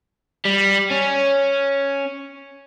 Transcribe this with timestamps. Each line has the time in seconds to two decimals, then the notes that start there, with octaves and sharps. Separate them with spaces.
0.45 G3
0.90 C#4